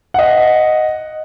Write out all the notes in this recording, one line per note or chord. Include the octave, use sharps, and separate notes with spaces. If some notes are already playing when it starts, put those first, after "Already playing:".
D#5 F#5